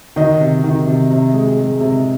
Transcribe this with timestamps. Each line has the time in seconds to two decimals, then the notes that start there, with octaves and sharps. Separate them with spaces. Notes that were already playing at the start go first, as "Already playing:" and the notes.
0.16 D#3 D#5
0.40 C3
0.64 D#3
0.87 C3
1.10 C3
1.34 G#3
1.58 G#3
1.80 C3